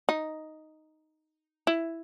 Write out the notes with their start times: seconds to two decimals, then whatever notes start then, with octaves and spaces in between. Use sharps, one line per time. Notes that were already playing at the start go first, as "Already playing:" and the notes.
0.09 D#4
1.67 E4